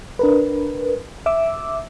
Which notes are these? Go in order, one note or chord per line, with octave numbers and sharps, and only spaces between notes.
D4 A#4 B4
E5 D6 E6